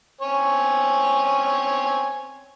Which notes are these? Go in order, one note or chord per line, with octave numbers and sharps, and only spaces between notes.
C4 C#5 G#5